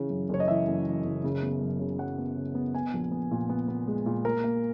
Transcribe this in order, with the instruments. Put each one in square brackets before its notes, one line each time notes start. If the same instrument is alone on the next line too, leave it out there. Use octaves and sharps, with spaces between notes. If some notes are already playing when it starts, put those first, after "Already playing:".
Already playing: [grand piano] C#3 E3
F#2
F#1 C#5
D#5
E3 E5
F#2
E3
F#1
C#3
B3
F#2
C#3
F#3 F#5
B3
C#3
B3
B3 G#5
A#1
B3
A#2
B3
B3
G#3
A#2
A#3 A#4
A#3